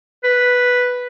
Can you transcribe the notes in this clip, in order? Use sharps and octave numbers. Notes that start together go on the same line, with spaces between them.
B4